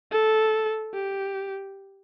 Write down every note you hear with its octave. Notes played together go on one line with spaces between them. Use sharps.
A4
G4